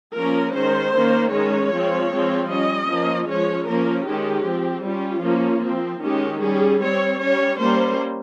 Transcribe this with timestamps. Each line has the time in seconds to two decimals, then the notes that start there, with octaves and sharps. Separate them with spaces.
0.17 F3 A#3 C#4 A#4
0.55 D#3 G#3 C#4 C5
0.95 D#3 A#3 C#4
1.33 D#3 G#3 C#4 C#5
1.73 F3 G#3 C4
2.12 F3 G#3 C4
2.51 G3 C#4 D#5
2.90 F3 A#3 C#4
3.30 F3 G#3 C#4 C#5
3.68 F3 A#3 C#4 A#4
4.08 D#3 G#3 C#4 G4
4.46 F3 C4
4.86 G3 C#4 F4
5.25 F3 A#3 C#4
5.64 F3 C4
6.03 D#3 G#3 C#4 G4
6.42 G3 C#4 G#4
6.82 G3 C4 C#5
7.21 G3 C#4 C#5
7.60 G3 A#3 C#4 C5